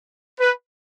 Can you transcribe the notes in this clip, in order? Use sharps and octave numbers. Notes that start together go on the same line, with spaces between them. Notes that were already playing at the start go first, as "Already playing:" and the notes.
B4